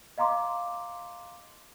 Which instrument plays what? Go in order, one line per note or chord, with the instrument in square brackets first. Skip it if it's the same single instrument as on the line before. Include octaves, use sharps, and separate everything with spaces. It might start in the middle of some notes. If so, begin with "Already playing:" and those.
[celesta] D#5 F5 A#5 C6 D6